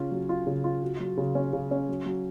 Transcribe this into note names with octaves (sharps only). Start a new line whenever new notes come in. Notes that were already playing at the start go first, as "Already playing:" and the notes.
Already playing: C#3 C#4 F4
F#3
F4
C#3
F4
F#4
F#3
C#3
C#4
C#3
C#4
F#3
F#3